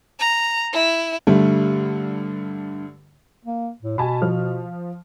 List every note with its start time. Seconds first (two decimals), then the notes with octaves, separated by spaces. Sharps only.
0.20 A#5
0.73 E4
1.27 G2 D3 G3 A3
3.46 A#3
3.83 A2
3.98 B2 G#5 A5 B5
4.22 F3 F6